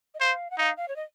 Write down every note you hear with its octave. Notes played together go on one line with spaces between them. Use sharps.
D#5
C5 F5
F#5
D#4 F5
F5
C#5
D#5